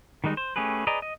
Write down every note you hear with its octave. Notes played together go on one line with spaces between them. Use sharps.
D#3 G3 G#3 D#4
C5
A3 C#4 G4 G#4 B4
G#4 B4 D5 D#5 A#5
D#5